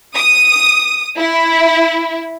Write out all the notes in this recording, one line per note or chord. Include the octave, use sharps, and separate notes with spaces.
D#6
E4